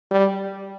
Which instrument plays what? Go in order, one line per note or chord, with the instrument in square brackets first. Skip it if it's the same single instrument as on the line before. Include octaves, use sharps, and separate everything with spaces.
[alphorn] G3